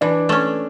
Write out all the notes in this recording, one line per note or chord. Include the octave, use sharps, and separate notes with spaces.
E3 D4
A3 C#4